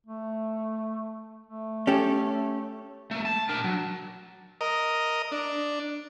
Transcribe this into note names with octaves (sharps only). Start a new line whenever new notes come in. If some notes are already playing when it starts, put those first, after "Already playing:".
A3
A3
C#4 G4 A4
A3 A#3
A5
D4 A#4
F#3
A#4 D#5
D4